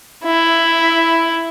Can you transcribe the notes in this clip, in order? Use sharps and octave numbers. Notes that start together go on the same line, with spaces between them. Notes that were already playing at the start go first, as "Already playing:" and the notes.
E4